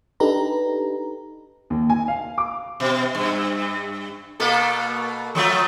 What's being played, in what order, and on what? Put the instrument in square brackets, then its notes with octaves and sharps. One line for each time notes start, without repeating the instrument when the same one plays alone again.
[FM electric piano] D4 D#4 G4 A4 B4 A#5
[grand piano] D#2
G#5
F5
D6
[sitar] B2
G2
B2 A#3 A4
F3 F#3 A3